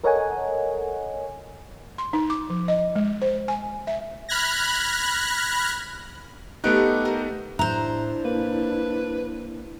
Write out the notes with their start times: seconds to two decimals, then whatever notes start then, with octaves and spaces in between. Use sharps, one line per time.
0.04 A4 A#4 C#5 D#5 F#5 G#5
1.98 C6
2.13 D#4
2.30 D6
2.50 F3
2.68 D#5
2.96 G#3
3.22 C5
3.48 G#5
3.87 E5
4.29 B5 F6 F#6 G#6 A#6
6.64 A3 B3 D#4 G4 F#5
7.05 A#4 C5
7.59 A2 D4 E4 C5 E5 A#5 F#6
8.25 A#3 B4